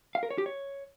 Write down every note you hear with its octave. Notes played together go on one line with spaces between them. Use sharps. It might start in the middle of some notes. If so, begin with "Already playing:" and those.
F5
A#4
C#5
G4
C#5